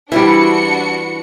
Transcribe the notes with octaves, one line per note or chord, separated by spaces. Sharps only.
E3 G3 D4 E4 F#4 C5 C#7